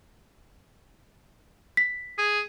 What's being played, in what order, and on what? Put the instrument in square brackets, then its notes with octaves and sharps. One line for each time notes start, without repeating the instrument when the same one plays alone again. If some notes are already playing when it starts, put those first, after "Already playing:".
[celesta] B6
[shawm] G#4